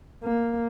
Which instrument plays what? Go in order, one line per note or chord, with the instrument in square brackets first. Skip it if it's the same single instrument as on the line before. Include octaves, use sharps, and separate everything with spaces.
[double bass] A#3